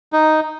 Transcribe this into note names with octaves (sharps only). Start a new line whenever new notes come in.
D#4